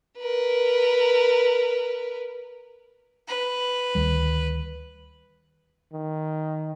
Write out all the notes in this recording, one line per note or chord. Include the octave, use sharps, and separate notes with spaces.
A#4 B4
B4
D2 D#3 G3
D#3